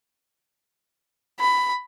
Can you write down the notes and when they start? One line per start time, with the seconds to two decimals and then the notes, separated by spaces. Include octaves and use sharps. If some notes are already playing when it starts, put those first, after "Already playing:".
1.40 B5